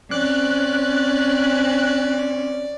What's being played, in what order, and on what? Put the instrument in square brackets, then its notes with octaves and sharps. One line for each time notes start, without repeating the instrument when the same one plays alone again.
[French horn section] C4 [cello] C#4 [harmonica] D5 [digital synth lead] F#6